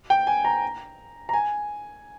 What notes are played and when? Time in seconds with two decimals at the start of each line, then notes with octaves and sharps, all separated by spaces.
0.10 G5
0.27 G#5
0.45 A#5
1.29 A#5
1.33 G#5